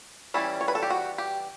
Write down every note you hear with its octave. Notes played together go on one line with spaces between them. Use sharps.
E3 G3 C#4 E4
C#5
B4
A4
G4
F#4
G4